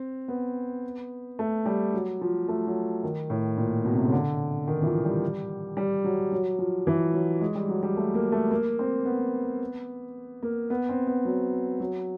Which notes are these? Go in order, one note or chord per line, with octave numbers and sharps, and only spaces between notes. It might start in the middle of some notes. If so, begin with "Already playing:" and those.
Already playing: C4
B3
A3
G3
F#3
F3
A3
F#3
D#3
A2
A#2
B2
C3
C#3
D3
D#3
E3
F3
G3
G3
F#3
F#3
F3
E3
F#3
G#3
G3
F#3
G3
A3
A#3
A3
A#3
C4
B3
A#3
B3
C4
B3
F#3
F#3